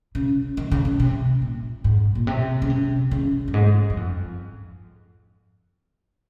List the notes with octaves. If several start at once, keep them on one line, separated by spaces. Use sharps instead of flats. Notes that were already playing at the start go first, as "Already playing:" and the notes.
C#3
D#3
C#3
C3
C3
A#2
G#2
A#2
C3
C#3
C3
C#3
F#2
G#2
F#2
F2